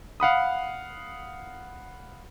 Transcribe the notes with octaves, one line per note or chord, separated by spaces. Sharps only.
F5 F#5 B5 D#6